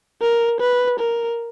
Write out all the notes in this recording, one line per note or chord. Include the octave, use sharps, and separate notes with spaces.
A#4
B4
A#4